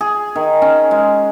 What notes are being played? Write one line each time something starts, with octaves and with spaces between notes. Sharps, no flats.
G#4
D#3
C#4
G#3